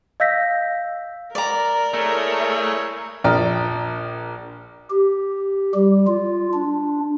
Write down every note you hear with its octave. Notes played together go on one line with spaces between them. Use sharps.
D#5 F5 E6 G6 A#6 B6
A#4 D5 A#5
A3 E4 G#4 C#5
A#1 D5 G5 A#5 F6
G4
G3
F4
D4